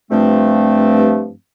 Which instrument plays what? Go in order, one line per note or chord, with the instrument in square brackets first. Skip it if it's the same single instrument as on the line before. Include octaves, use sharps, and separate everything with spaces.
[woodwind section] G2 F3 A3 C4